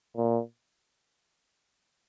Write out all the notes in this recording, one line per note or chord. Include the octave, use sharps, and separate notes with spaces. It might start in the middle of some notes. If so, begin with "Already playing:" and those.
A#2